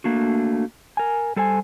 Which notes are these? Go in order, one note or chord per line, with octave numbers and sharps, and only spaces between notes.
A3 A#3 D4 F#4
A#4 G#5
G3 A4 C5 G#5